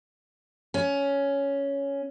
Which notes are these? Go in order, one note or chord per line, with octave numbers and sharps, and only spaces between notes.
C#4